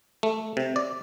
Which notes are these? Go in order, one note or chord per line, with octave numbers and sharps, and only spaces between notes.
A3
C3
D5